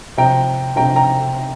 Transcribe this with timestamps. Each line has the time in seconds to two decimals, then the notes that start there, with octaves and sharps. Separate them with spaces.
0.17 C3 F3 G5 A#5
0.76 C3 F3 G5 A#5
0.96 G5 A#5